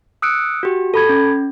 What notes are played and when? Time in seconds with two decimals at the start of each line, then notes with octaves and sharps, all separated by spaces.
0.22 D#6 E6 F#6 C#7 D7
0.63 F#4 G4
0.94 A4 B5 G#6
1.09 C#4